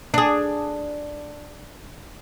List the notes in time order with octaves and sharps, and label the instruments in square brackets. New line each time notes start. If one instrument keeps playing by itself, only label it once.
[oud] D4 G#4